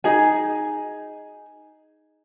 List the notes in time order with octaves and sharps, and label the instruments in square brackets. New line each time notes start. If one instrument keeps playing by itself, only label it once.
[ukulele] D#4 G#4 G#5